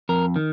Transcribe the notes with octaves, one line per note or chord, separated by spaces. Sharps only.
F2 A#4
D#3